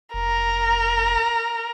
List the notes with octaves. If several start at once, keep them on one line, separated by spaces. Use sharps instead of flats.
F1 A#4